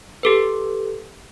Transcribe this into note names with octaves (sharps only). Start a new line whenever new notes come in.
G4 A4 B4